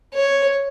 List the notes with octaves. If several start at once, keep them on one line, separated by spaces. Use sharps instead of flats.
C#5